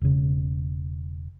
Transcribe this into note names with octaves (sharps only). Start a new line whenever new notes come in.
E1 C#3